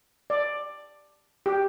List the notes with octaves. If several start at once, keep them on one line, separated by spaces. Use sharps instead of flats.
D5
G4